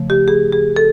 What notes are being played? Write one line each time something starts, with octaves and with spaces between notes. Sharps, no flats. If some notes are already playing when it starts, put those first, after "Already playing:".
Already playing: C#3 F3 A3
G4
G#4
G#4
A4